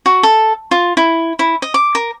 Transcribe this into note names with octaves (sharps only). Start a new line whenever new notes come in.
F#4
A4
F4
E4
E4
D#5
D6
A#4